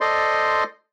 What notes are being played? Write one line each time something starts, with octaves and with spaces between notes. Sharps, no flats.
A4 C5 D5 D#5 C6